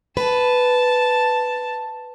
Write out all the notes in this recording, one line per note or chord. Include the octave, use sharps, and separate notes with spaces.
B4 A5